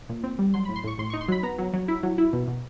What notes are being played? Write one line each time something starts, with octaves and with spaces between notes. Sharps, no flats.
A#2
C4
G3
F#3 C6
A2 B5
C6
A2 C#6
A2 C6
D#4 C#6
C6
F#3 B5
B3 A#5
F#3
F#3
E4
F#3
E4
B2
B2